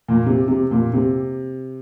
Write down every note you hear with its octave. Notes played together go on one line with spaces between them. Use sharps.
A#2
C3
C3
A#2
C3